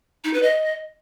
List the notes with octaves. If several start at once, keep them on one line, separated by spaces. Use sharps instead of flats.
D#4
B4
D#5